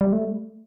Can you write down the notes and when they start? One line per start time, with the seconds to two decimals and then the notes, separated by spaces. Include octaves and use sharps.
0.01 G3
0.13 A3